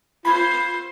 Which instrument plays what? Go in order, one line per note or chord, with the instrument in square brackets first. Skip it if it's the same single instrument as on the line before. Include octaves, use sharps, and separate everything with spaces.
[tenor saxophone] F4 [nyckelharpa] C5 [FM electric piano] B5 G#6